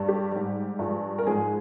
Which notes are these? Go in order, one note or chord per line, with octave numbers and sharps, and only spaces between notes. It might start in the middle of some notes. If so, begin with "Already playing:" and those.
Already playing: G2 G3
G4
G#2 G3
G2 F3 G#3
A#4
G#2 F3 G#3 G#4